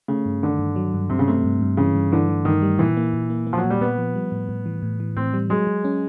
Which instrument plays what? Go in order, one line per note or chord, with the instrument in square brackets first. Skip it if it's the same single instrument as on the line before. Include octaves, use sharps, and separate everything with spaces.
[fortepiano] C#3 [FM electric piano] A3
[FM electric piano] G2
[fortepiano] D3 [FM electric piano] D#3
[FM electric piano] G2
F#3
G2
[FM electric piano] G2 [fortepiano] C3
[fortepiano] C#3
[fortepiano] C3 [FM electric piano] A3
[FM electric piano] G2
G2
[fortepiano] C#3 [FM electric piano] E3
[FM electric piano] G2
[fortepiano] D3 [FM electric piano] E3
[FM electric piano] E3
[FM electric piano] G2 [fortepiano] D#3
[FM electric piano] G3
[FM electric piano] A#2 [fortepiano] E3
[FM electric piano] A#3
A#2
A#3
A#3
[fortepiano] F3
F#3
[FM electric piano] A#2
[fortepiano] G3
[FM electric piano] A#2 [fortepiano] B3
[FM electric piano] F3
G3
A2
A2
E3
A2
E3
[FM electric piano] A2 [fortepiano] C4
[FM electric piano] G3
[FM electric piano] F#3 [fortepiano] G#3
[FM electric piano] F#3
C#4